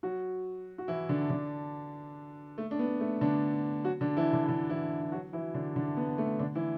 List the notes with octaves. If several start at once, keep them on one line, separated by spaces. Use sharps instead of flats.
F#3 F#4
F#4
E3 E4
D3 D4
D3 D4
A3
D4
B3
A3
D3 D4
F#3 F#4
D3 D4
E3 E4
D3 D4
E4
D3 D4
E3 E4
E4
F#3 F#4
E3 E4
D3 D4
D3 D4
B3
A3
D3 D4
E3 E4